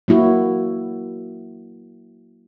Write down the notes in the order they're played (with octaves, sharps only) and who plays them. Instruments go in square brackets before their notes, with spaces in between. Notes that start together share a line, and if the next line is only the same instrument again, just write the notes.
[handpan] F#3 A#3 E4 F#4